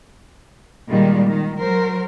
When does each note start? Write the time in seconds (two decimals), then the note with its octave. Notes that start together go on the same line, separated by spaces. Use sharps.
0.89 A#2 D#3 G3 G#3
1.27 D#3
1.59 F#3 A#4 C5